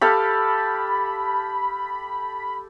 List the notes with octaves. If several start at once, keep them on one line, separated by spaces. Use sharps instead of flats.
G4 A4 F5 B5